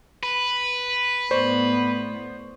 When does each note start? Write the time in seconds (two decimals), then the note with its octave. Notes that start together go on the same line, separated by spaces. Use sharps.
0.23 B4
1.31 A2 B3 C5 D5 C#6